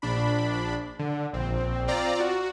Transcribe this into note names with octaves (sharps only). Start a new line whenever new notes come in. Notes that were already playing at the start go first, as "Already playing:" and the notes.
A#1 D4 B5
D3
A#1 C4
C4 F4 D5 A#5
F#4